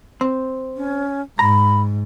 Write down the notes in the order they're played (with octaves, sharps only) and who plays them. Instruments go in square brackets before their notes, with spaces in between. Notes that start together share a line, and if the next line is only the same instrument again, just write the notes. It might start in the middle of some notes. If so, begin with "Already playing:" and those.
[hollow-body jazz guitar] C4
[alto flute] C#4
[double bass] G#2 [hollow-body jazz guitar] A#5 [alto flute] B5